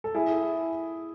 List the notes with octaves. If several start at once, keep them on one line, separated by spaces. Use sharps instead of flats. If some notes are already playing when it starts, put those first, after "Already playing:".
A4
E4 G#4